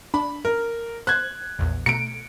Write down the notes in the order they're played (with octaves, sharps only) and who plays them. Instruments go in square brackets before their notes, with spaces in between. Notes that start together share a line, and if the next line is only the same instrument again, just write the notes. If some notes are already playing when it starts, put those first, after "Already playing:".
[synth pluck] D4 [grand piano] B5
[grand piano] A#4
[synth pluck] C5 [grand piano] F#6 G#6
[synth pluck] A#1 E2
[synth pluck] B2 A3 A#5 [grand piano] C#7 D7